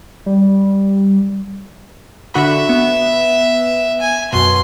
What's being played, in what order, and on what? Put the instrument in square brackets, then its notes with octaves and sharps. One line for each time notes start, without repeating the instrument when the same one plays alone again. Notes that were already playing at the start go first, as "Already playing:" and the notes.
[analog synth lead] G3
[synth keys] D3 F#4 B5 [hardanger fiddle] E5
[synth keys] B3
[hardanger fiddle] G#5
[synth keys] F#2 B2 [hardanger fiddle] C6